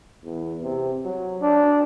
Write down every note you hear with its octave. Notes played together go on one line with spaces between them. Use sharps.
E2
C3
F#3
D4